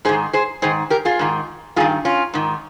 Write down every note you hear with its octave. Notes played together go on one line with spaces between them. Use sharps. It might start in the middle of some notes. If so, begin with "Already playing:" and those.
G#2 D#3 G#4 C5
G#4 C5
G#2 D#3 G#4 C5
G4 A#4
F4 G#4
G#2 D#3
G2 D#3 F4 G#4
C#4 F4
G#2 D#3